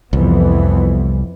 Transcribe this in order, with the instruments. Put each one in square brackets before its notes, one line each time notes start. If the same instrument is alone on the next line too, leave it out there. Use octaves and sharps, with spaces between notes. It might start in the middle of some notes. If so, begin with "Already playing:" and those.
[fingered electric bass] C2 [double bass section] F2 E3 B3